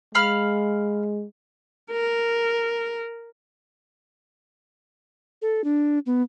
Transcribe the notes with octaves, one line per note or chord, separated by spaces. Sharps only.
G#3 F5 B5 F6
A#4
A4
D4
B3